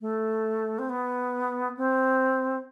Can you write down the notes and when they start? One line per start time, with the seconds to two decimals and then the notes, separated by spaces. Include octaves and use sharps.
0.01 A3
0.79 C4
0.89 B3
1.77 C4